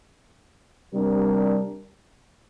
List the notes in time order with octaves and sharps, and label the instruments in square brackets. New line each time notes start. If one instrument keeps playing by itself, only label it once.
[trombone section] C3 G3 D4 G4 A#4